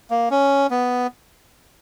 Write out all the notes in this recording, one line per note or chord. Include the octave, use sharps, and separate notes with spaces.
A#3
C#4
B3